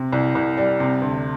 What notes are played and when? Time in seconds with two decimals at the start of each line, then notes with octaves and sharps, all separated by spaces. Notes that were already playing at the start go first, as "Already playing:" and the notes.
Already playing: C3
0.13 C2
0.35 C2
0.57 G3
0.80 C3
1.02 D2